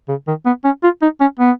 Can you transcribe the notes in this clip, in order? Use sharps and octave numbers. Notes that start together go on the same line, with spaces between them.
C#3
D#3
B3
C#4
F4
D#4
C#4
B3